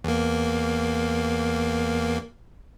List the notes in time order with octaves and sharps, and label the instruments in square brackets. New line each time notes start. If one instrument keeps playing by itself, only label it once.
[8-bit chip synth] E2 A#3